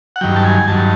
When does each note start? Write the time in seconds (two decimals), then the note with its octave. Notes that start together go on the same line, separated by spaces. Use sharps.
0.16 F#5
0.21 G2 D#3 F#3 G5
0.36 A5
0.45 G#5
0.68 G2 D#3 F#3 A5